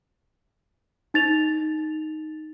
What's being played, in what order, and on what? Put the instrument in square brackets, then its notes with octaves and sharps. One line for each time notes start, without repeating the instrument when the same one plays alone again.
[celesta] D#4 A6 F7